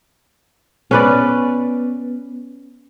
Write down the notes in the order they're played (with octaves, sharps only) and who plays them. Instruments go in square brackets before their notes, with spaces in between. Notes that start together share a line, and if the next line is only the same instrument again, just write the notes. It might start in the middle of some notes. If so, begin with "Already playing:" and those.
[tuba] B3 [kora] C#4 B4 D5